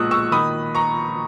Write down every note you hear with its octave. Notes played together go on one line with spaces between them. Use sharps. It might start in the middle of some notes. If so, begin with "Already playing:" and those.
Already playing: B1 A#2 G#3 C#6 D#6 E6 F#6
C#6 E6
D#3 B5 D#6
A#5 C#6